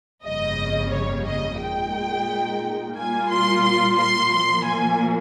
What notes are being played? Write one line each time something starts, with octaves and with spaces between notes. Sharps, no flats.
G1 F2 C#3 G3 A#3 D#5
C#5
D#5
A#2 G#3 D#4 G5
A#2 G3 A#3 F4 G#5
C6
C6
C6
A#2 F3 A#3 C6
G#5